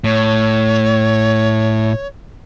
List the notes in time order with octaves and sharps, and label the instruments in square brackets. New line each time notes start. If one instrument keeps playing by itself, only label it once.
[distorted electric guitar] A2 [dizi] C#5